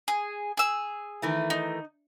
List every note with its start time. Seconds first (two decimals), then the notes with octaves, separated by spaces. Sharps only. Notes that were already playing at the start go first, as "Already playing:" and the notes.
0.08 G#4
0.57 G#4 E6
1.22 D#3 E3 A3
1.50 D#4